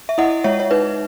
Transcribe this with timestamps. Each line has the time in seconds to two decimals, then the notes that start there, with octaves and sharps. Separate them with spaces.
0.09 E5
0.18 E4 D#5 F#5
0.44 G#3 C#5 E5
0.60 C#5
0.71 D#4 B4